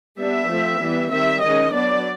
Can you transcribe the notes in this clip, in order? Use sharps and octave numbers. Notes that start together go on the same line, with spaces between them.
G3 B3 D4 E5
F3 A3 C4
E3 G3 B3
D#3 G3 C4 E5
D#3 G#3 C#4 D#5
F#3 B3 D4 D5